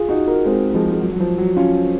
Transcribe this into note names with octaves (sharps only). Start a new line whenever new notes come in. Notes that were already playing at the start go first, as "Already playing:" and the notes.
Already playing: F4 G#4
D#4 F#4
F#4 A#4
G#3 C4
F3 G#3
G#3
F#3
F#3
F3
F#3
C#4 F4